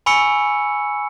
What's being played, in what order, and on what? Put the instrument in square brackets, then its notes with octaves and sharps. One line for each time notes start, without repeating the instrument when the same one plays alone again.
[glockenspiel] G#5 B5 C#6 E6 C#7